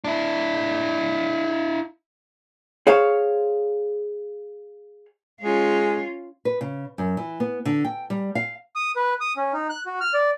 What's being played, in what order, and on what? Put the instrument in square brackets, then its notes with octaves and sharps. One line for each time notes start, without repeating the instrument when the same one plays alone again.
[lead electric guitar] D4 E4
[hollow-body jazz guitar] G#4 C5 C#5 F5
[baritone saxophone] G#3 [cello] C#4 F4
[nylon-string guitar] B4
C#3
F#2
E3
B3
D3
G5
G3
F5
[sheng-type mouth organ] D#6
B4
D#6
C#4
D#4
F#6
F#4
F6
D5